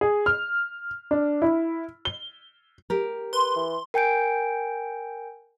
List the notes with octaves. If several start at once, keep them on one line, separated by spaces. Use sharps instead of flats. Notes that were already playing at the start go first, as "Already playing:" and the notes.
G#4
F6
D4
E4
G7
G4 A#4
B4 C6
E3
A#4 G5 G#5 G6 D7